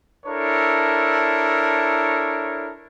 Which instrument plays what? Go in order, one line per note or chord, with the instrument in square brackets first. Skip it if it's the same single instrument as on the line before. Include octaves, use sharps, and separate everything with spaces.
[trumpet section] D4 E4 A4 A#4 C#5